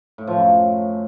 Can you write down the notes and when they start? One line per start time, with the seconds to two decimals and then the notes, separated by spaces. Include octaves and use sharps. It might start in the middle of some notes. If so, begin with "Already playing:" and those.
0.18 A2
0.27 F3
0.37 F#2